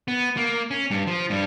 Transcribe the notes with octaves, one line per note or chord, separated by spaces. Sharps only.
B3
A#3
C#4
G2
F3
G2 G3